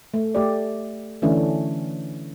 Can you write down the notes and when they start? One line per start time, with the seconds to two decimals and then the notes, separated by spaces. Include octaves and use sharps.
0.14 A3
0.35 A3 G4 D5
1.22 D3 E3 A3 C#4 D4